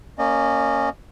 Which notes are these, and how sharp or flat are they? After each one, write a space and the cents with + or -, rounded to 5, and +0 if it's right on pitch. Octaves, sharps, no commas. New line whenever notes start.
A#3 -15 C#4 +0 D#5 -30